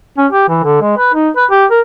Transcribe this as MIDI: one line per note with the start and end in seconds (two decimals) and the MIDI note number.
0.18 0.27 61
0.32 0.47 67
0.49 0.63 52
0.63 0.80 50
0.81 0.94 56
0.97 1.09 71
1.14 1.29 63
1.36 1.45 71
1.51 1.65 67
1.71 1.80 70